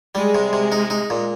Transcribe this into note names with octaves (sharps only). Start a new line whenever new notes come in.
G3 G#3
C3
C3
D#4
D#4
A#2